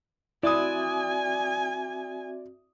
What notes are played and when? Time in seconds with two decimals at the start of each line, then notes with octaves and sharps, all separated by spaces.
0.43 C4 E4 F#4 D5 E5 G#5 D#6